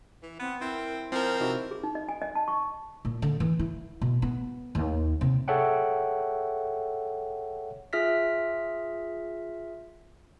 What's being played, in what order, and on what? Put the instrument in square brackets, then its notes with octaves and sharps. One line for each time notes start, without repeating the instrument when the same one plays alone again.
[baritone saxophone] E3
[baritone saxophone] B3 [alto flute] C4
[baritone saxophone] C4 [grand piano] E4 [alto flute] A#4
[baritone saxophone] F3 [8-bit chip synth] C4 A#4 [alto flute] C5
[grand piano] C3 D#4 E4 [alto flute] F#4
[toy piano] G#4
D#4
D#5
G#5
D#5
A5
C#6
[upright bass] A#2
D3
E3
E4
B2
B3
D#2
C3
[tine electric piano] G#4 A4 C#5 E5 F#5 G5
[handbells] F4 G#4 E5 F6 A#6 B6